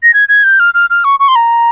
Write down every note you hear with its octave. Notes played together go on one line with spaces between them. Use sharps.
A#6
G#6
G#6
G6
F6
F6
F6
C#6
C#6
C6
A#5